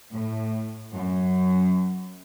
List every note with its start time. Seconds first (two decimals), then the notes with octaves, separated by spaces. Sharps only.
0.12 A2
0.94 F#2